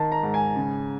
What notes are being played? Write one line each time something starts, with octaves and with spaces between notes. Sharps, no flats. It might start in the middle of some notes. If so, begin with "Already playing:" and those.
Already playing: D#3 A5
A#5
G#2
G#5
C#3